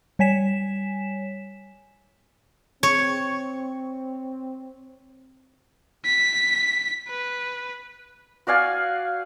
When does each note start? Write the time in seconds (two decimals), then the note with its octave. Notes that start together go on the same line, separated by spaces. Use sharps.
0.19 G3 C#5 G#5 B6 E7
2.83 C4 C#5
6.05 B6
7.09 B4
8.47 F#4 D5 F5 G#5